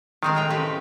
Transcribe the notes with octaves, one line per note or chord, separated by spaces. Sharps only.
D#3 G#3 C4 D#4
A2 G5 A#5
C#3 G4 B4